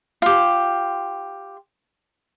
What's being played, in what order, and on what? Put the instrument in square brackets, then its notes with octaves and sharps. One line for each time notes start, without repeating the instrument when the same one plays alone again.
[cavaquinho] F4 G4